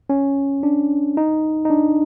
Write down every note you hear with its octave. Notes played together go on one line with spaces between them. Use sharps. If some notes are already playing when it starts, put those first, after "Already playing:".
C#4
D4
D#4
D#4
D4